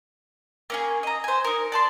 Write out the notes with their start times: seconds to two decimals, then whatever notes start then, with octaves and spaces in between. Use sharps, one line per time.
0.70 A#3 C#4 G#4
1.03 D#5 A#5
1.24 C5 G#5
1.44 D#4 A#4
1.72 D5 A5 C6